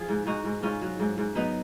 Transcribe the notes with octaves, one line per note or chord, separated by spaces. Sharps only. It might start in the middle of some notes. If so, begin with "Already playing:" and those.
Already playing: F3 F4 G#4
G#2
G#2 D#4 F#4
G#2
G#2 C#4 F4
F#3
G#2
G#2
F#3 B3 D#4